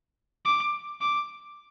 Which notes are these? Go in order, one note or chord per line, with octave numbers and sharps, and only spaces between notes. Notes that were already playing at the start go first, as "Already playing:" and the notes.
D6
D6